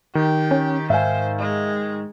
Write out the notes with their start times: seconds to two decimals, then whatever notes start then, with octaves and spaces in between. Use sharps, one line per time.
0.15 D#3 G4
0.51 C#4
0.90 G#2 C5 E5 F5 G#5
1.39 G#3